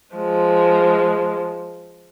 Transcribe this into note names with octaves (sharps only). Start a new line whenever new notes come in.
F3 G#3